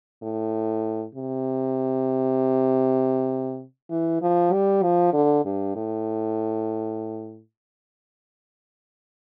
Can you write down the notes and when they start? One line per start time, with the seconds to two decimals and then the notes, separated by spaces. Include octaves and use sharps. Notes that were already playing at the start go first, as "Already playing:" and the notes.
0.23 A2
1.15 C3
3.90 E3
4.22 F3
4.53 G3
4.83 F3
5.13 D3
5.45 G2
5.76 A2